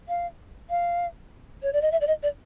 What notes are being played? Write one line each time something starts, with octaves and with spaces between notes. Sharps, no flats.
F5
F5
C#5
D5
D#5
E5
D5
D#5
D5